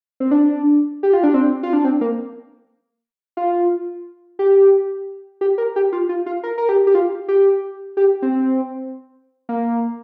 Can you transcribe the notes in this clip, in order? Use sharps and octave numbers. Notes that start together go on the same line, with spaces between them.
C4
D4
G4
F4
D4
C4
F4
D4
C4
A#3
F4
G4
G4
A#4
G4
F4
F4
F4
A#4
A#4
G4
G4
F4
G4
G4
C4
A#3